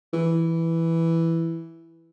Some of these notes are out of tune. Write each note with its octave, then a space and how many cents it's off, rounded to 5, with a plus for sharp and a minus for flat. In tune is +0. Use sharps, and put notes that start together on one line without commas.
E3 +0